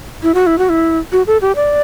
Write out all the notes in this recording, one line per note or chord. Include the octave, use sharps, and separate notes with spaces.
E4
F#4
E4
F#4
E4
F#4
A4
G4
D5